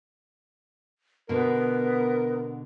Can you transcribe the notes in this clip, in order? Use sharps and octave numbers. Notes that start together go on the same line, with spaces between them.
B2 D3 B3 A#4